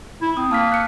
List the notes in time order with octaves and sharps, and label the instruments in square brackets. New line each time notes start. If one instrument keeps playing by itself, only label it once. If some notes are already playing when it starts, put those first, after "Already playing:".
[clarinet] E4
[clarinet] C4 [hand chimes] D#6
[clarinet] A#3 [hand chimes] A5 F6 B6
[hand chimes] F#6 C#7